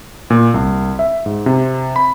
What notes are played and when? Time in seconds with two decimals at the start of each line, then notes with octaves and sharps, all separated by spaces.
0.30 A#2
0.54 C2
0.99 E5
1.26 G#2
1.46 C3
1.96 B5